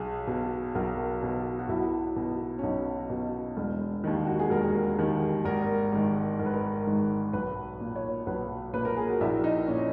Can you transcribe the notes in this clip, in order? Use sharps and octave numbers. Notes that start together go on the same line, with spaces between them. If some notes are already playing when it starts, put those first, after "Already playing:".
Already playing: B1 G#4
B2
B1 A#4
B2
F#4
B1 E4
B2
C#4
B1 D#4
B2
E1
D#2 D#3
F#4
G#4
E1 A#4
D#2 D#3
G#1 A#4
G#2 D#3
G#1 A#4
B4
A#4
G#2 D#3
B1 B4
A#2
C#5
B1 B4
A#2 B4
A#4
G#4
F#4
A#1 E4
D#4
A#2 C#4